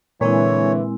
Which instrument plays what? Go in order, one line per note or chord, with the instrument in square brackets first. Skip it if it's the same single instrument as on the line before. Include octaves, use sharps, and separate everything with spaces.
[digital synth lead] A#2 [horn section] D3 E3 [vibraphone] G#3 C4 E4 [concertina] C#5